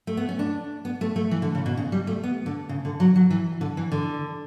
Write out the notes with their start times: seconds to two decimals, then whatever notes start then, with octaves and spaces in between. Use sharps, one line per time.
0.07 A3
0.17 B3
0.29 C#4
0.39 D4
0.85 B3
1.01 A3
1.16 A3
1.31 E3
1.42 D3
1.55 C#3
1.66 B2
1.77 C#3
1.92 G3
2.07 A3
2.23 B3
2.46 D3
2.69 C#3
2.85 D3
3.00 F#3
3.16 F#3
3.31 E3
3.61 D3
3.77 E3
3.92 D3